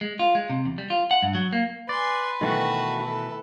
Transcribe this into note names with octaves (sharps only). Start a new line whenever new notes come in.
G#3
F4
G#3
C3
E2
G3
F4
F#5
G2
F#3
A#3
B4 D5 G#5 C6
B2 D#3 E3 A3 F#4 A5
E4 A4